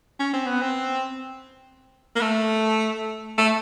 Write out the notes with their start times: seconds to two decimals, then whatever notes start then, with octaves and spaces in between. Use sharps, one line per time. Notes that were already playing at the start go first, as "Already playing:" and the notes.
0.20 C#4
0.34 C4
0.47 B3
0.62 C4
2.16 A#3
2.21 A3
3.38 A3